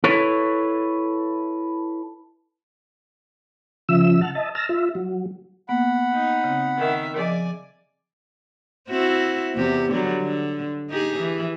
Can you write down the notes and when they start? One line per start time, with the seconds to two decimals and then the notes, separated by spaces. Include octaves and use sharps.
0.04 E4 A4 B4 C#5
3.89 C#3 F3 E5 E6
4.21 F#5 A5 F6
4.35 D#5 E5 A5
4.55 A5 A#5 E6 F6
4.69 F4 E5
4.95 F#3
5.69 A#3 B3 F#5 B5
6.13 D#4
6.44 C#3 C4
6.77 D#3 E5
7.16 F3 G#4 D5 D#5 G#5
8.89 C4 E4 F#4
9.55 E2 C3 G4
9.90 D3 F#3 G3
10.21 D3
10.90 D#4 G4 G#4
11.19 E3